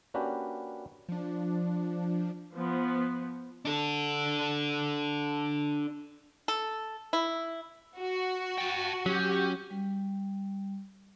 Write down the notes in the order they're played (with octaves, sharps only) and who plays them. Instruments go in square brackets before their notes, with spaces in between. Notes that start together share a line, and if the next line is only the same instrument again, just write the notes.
[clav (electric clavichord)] A#3 C#4 D4 F#4 G4 B4
[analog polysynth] F3 D4
[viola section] F3 B3
[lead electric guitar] D4 A4
[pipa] A4
E4
[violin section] F#4
[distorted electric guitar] G5 A5
[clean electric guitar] F#3 [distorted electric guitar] C#4 [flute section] G4
[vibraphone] G3